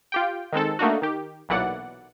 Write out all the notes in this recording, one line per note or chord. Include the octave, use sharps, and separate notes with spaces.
F4 G4 G5
D#3 G#3 C4 A4
A3 A#3 D4 D#4 F#4
D#3 G4
B1 A#2 E3 F#3 D5 F#5